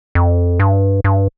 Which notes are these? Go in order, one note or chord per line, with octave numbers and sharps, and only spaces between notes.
F2
G2
G2